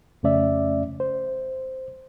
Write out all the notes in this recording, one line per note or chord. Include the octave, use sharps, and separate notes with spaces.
F2 C#3 A3 C#4 D5 E5
C5